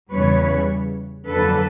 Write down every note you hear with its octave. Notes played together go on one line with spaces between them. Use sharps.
E2 C#3 E3 G3 B4 C#5
F2 D3 F#3 A#3 A4 B4